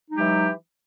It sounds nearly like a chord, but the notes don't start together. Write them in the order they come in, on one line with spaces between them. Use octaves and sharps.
D#4 F#3 G#3 G4 E3